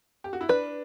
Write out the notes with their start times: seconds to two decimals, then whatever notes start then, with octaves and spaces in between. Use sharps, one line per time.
0.24 G4
0.33 F#4
0.41 E4
0.49 D4 B4